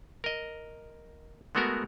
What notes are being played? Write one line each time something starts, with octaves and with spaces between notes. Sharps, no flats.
A#4 D#5
G#3 A3 B3 F#4 A#4